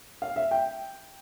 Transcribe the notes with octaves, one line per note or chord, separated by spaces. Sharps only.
F5
E5
G5